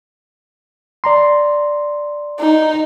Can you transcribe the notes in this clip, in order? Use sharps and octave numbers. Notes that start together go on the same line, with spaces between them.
D5 A#5 C6
D#4